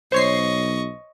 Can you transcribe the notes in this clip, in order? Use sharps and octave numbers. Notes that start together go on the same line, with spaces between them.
B1 C5 C#5 D#5 C#6 C7